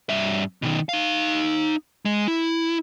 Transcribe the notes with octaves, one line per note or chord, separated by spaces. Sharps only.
G2 E5
B2 D#3
D#4 F5
G#3
E4